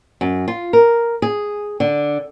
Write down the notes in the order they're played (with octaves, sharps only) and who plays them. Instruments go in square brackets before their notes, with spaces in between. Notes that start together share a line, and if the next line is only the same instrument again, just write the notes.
[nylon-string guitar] F#2
F4
A#4
G#4
D3